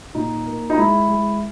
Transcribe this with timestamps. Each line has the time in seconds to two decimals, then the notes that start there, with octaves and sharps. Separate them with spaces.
0.15 A#2 D#4
0.46 A#3
0.70 D#4
0.77 G#3 E4
1.09 G#3